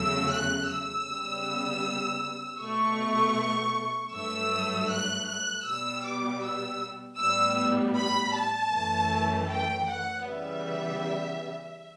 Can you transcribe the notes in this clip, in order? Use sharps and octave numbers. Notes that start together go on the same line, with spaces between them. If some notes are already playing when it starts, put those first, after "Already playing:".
Already playing: E2 C#3 F#3 A3 E6
F#6
E6
C#3 G3 B3
B2 A3 C#6
G2 F#3 A3 E6
F#6
F#6
B2 G3 B3 E6
D6
E6
A2 G3 B3 E6
B5
A5
F#2 E3 A3
G5
F#5
C#3 E3 G3 B3 E5